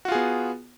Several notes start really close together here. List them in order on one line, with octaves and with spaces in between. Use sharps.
F#4 F4 G#4 B3